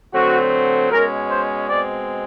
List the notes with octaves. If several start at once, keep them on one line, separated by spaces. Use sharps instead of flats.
D3 F#3 A3 C4 F#4
B2 G#3 C#4 A#4
C5
B2 G#3 C4 D5